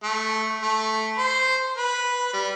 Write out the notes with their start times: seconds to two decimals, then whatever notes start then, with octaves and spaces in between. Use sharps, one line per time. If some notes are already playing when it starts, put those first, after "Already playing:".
0.04 A3
0.63 A3
1.18 C5
1.77 B4
2.33 G3